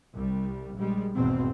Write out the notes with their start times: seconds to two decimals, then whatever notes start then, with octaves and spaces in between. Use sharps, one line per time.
0.15 C2 G3
0.76 A#1 G3 G#3
1.14 G#1 E2 G#2 B2 C4